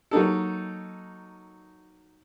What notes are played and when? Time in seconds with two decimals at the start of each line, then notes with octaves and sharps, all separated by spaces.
0.11 F#3 A#3 D#4 A4